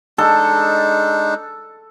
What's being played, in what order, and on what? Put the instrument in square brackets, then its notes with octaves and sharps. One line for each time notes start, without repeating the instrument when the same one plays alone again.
[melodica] G#3 D4 D#4 [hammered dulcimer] A4